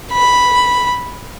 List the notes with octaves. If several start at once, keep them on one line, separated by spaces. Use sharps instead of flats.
B5